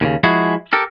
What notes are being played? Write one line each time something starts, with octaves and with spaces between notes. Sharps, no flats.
D#2 A#2 C#3
F3 G#3 E4 F#4 G#4
G4 A4 A#4